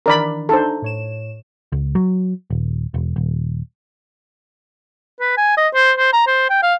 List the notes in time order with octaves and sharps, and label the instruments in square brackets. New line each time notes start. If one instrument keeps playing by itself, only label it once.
[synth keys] D#3 E3 D4 [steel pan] A#4 D5 B5
[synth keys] D4 D#4 A#5 [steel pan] A4 C5
[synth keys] A2 C#5 E7
[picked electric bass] C#2
F#3
D#1
E1
D#1
[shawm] B4
G#5
D#5
C5
C5
A#5
C5
G5
F5